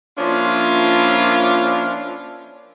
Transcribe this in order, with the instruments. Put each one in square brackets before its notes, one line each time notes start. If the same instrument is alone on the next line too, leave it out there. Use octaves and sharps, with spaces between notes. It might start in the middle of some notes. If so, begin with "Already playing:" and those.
[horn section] F3 A#3 C#4 D4 E4 F4